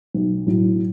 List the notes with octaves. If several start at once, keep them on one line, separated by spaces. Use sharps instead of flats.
B1
A2 F#3